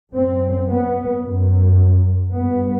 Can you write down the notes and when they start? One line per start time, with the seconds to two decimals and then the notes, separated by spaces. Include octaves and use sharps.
0.14 F#2 C4
0.69 B3
1.25 F#2
2.34 G2 B3